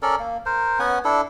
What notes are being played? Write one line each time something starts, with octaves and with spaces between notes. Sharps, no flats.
C#4 A4 A#4 D5
A#3
A#4 C5
B3 C#4 F#5 G#5
D4 E4 A4